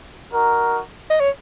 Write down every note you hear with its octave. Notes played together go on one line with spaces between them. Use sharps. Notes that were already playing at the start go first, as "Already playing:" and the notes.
D#4 F#4 A#4
D#5
C#5